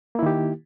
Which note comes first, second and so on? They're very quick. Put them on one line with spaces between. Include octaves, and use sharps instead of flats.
A#3 E4 D#3 G4